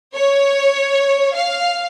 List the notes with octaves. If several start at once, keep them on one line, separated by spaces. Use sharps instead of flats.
C#5
F5